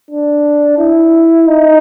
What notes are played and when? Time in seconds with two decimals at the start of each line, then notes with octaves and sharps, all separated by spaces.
0.11 D4
0.78 E4
1.47 D#4